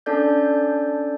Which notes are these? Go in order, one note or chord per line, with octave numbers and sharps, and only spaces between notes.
C#4 D4 A4 D5 G6